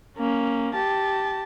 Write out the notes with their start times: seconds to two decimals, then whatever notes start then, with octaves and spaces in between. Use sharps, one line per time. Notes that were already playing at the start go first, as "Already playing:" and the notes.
0.18 A#3 C#4
0.74 G4 A5